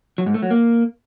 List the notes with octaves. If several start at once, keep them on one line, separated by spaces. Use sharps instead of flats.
F#3
G#2
A3
F#3
A#3